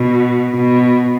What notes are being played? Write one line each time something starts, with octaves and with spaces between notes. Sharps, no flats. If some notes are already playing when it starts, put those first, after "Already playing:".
Already playing: B2
B2